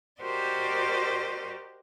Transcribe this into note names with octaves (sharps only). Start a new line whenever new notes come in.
F#4 G4 A#4 C5 D5 D#5